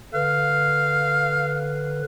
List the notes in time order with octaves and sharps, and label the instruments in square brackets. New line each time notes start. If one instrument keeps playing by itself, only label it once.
[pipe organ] D3 B4 [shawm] F5